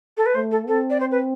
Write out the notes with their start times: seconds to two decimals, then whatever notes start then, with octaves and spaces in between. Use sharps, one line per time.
0.17 A4
0.26 B4
0.35 A3 C5
0.51 A4
0.68 C4 A4
0.90 D5
1.00 C5
1.11 B4